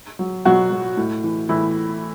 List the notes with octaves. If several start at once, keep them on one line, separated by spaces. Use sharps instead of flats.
F#3
B2 F#3 F#4
F#3
A2
E3
A2 E3 E4